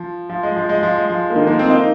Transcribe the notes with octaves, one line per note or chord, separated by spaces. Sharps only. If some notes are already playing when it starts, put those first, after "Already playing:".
Already playing: F3
F3
G#3
F3
G#3
F3
G#3
F3
A#3
D#3 G#3
F3 A#3
G#3 C4
A#3 D#4